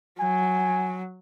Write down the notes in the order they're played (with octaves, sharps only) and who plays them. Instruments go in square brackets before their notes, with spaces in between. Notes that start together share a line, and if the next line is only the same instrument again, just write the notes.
[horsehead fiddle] F#3 [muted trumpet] G#5